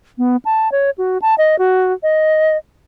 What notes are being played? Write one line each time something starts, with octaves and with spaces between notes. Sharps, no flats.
B3
A5
C#5
F#4
A5
D#5
F#4
D#5